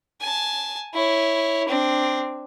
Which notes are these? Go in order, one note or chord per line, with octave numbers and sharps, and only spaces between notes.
G#5 A5
E4 C#5
C4 D4